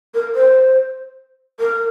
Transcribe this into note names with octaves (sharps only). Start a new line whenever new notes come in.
A#4
C5
A#4